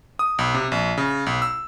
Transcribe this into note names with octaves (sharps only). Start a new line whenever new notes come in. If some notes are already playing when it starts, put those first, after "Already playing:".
D#6
B1
C3
A#1
C#3
B1
E6